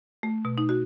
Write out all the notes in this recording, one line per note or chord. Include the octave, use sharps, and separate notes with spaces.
A3
B2
D#4
F#4